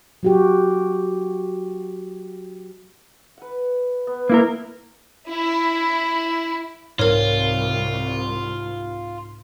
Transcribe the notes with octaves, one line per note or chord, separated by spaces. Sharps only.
F#3 F#4 G4
B4 F#5
B3
A#3 E4 A#4
E4
C2 G#2 F4 A#4 C#5